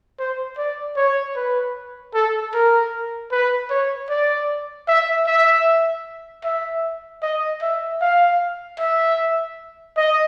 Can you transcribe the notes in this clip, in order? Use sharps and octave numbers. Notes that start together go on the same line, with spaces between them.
C5
D5
C#5
B4
A4
A#4
B4
C#5
D5
E5
E5
E5
D#5
E5
F5
E5
D#5